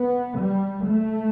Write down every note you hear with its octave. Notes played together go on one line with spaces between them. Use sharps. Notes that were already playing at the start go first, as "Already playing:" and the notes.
Already playing: B3
G3
A3